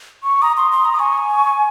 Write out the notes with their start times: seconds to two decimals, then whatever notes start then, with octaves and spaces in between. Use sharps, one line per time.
0.23 C#6
0.42 A#5 D#6
0.57 C6
0.72 C6
0.85 A#5
0.93 D#6
0.99 G#5 C#6